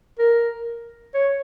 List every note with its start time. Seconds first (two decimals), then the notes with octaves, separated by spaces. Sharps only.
0.19 A#4
1.14 C#5